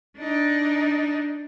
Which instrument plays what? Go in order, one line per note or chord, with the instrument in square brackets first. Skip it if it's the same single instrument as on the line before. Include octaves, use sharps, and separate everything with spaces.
[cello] D4 D#4